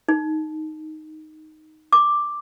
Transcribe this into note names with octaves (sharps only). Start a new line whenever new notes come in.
D#4
D6